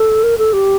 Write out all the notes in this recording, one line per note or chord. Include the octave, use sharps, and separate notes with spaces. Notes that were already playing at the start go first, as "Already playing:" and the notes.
Already playing: A4
A#4
A4
G4